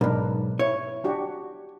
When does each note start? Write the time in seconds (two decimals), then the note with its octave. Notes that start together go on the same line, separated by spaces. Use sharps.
0.01 B1 G#2 D4 A#4 B4
0.59 E4 C#5
1.04 D4 F#4 G4